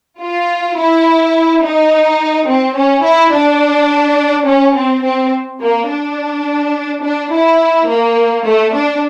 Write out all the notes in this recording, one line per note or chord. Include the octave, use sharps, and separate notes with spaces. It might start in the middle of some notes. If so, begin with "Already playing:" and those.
F4
E4
D#4
C4
C#4
E4
D4
C#4
C4
C4
A#3
D4
D4
E4
A#3
A3
D4